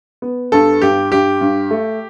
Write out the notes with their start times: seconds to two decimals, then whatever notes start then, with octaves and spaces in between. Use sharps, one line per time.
0.22 B3
0.52 G2 A4
0.82 G2 G4
1.12 G2 G4
1.41 G2
1.71 A3